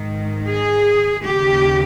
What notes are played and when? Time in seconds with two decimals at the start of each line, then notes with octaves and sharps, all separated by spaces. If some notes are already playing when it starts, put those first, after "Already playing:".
Already playing: G#2 D#3
0.46 G#4
1.23 D#2 C#3 G4